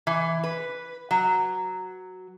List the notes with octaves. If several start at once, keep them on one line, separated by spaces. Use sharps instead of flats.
E3
B4
F#3